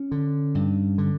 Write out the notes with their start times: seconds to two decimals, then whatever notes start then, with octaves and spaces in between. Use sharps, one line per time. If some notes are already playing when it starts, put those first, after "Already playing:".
Already playing: C#4
0.11 D3
0.55 G2
0.98 D3